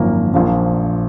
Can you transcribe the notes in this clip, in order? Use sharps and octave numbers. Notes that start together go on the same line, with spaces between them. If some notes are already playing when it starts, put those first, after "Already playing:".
Already playing: G#1 F#2 F3 A#3 C#4
A#1 A#2 F3 A#3